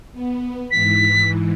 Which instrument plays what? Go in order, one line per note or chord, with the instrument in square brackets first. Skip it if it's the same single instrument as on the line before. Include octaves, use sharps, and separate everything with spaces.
[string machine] B3
[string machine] G#2 E3 [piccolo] B6